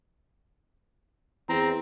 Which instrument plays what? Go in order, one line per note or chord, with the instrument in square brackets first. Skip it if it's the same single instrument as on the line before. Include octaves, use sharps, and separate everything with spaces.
[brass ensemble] E2 [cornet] C4 [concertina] A#5